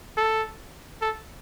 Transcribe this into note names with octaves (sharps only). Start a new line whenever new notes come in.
A4
A4